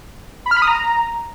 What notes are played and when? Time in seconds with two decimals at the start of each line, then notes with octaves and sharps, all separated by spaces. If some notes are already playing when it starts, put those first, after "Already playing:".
0.46 B5
0.51 F6
0.57 B5
0.62 D#6
0.67 A#5